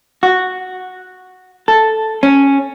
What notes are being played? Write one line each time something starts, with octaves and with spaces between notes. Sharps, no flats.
F#4
A4
C#4